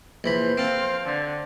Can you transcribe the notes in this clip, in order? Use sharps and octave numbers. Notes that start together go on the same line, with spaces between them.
A#1 E3 C5 B5
C4 A4 F5
D3